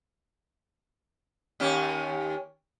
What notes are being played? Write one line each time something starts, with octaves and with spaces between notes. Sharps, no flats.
D#2 C#4 G4